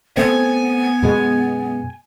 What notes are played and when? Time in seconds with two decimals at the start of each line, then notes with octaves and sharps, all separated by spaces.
0.17 A3 B3 C4 G#5
1.03 F#2 B2 G#3